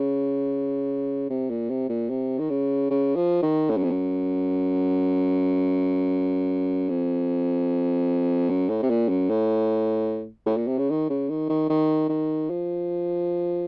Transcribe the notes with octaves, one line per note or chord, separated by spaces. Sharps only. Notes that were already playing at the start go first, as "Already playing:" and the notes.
Already playing: C#3
C3
A#2
C3
A#2
C3
D#3
C#3
C#3
F3
D#3
A2
F#2
F2
F#2
F2
F#2
A2
C3
A#2
F#2
A2
A2
A#2
C3
C#3
D#3
C#3
D#3
D#3
D#3
D#3
F3